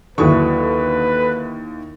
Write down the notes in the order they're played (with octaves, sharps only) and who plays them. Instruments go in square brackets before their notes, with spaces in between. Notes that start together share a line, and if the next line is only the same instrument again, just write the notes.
[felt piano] D#2 E4 C#6 [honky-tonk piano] D3 F#3 D#6 [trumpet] B4